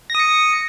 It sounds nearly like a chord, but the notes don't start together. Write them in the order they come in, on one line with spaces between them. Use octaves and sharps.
A#6 D#6 C#7